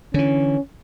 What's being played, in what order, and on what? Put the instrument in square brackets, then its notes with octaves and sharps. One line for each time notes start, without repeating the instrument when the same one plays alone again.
[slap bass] D3 E3 [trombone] C#4